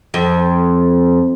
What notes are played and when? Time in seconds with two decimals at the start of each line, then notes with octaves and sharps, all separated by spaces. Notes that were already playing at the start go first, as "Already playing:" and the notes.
0.14 F2